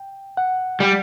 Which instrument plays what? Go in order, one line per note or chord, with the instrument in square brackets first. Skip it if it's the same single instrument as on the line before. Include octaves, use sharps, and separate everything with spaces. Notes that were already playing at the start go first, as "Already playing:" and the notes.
Already playing: [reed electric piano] G5
F#5
[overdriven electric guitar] G3